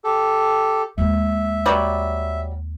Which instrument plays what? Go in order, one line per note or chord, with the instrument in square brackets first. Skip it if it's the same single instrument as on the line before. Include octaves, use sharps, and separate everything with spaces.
[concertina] G4 A4
[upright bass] D#2 G#3 [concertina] E5
[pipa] F#3 G3